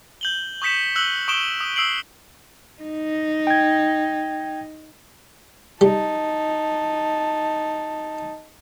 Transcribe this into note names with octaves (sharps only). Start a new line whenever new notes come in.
G6 F#7 G7
C#6 D#6 G6 B6 C#7 E7
E6 F#6 F#7 G7
C#6 D#6 D7 E7 G7
D#6
D#6 E6 C7 D7 F#7
D#4
G5 G#6
G3 D#4 A5